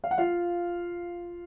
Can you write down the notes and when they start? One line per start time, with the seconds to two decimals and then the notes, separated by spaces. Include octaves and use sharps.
0.04 F5
0.11 F#5
0.18 F4 F5